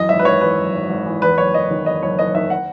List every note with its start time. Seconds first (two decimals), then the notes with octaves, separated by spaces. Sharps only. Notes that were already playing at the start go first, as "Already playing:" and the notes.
Already playing: F#2 E3 D#5
0.09 G#1 E5
0.19 B4
0.25 G#1 C#5
0.41 E3 B4
0.57 F#2
0.73 G#1
0.90 G#1
1.06 E3
1.22 E2 B4
1.38 F#1 C#5
1.54 F#1 D#5
1.70 D#3
1.86 E2 D#5
2.02 F#1 C#5
2.19 F#1 D#5
2.35 D#3 E5
2.50 F#5